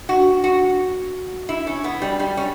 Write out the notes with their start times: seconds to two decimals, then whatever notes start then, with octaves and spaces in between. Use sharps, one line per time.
0.09 F#4
0.44 F#4
1.49 E4
1.67 C#4
1.84 B3
2.02 G3
2.20 G3
2.37 C#4